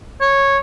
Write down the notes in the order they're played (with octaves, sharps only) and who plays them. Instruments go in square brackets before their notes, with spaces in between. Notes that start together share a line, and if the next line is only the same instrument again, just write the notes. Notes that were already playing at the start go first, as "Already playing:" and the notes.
[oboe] C#5